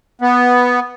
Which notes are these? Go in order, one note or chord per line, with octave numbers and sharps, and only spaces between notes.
B3